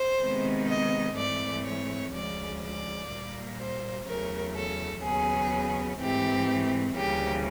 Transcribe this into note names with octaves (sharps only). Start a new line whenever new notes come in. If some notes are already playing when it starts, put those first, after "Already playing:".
Already playing: C5
C3 D#3 G#3 B3
D#5
G#2 E3 A3 C4 D5
C#5
D2 C#3 F3 G#3 D5
D5
A#2 G3 A#3
C5
E2 C#3 F#3 A3 A#4
A4
D#2 C#3 F#3 B3 G#4
G#2 E3 A3 C4 G4
D2 C#3 E3 G3 A#3 G4